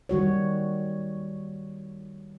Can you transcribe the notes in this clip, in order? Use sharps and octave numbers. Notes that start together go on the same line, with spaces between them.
D#3 G3 F#4 C#5